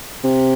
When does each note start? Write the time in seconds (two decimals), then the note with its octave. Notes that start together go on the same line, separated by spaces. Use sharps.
0.24 C3